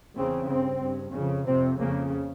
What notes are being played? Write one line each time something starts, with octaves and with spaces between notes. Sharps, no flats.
E2 C#3 C4
G2 C4
G2
F2 C#3
F2 C3 C4
F2 C#3 A#3